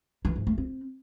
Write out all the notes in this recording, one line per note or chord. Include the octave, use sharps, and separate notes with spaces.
E3
G#2
A3
C4